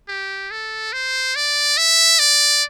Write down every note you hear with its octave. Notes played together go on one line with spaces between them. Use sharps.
G4
A4
C5
D5
E5
D5